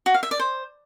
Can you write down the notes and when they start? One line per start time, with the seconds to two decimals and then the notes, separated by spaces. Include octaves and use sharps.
0.06 F#4
0.14 F5
0.23 E5
0.31 D5
0.39 C5